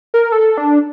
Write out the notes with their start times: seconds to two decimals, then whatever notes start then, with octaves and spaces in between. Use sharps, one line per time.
0.14 A#4
0.32 A4
0.58 D4